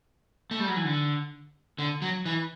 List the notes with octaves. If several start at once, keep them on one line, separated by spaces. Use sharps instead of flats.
A3
G3
F#3
E3
D3
D3
F#3
E3